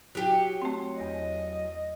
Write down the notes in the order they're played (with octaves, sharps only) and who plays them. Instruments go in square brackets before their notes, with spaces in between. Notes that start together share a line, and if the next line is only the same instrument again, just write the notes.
[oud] F#3 G4
[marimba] A3 C4
[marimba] E2 A#6 [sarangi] D#5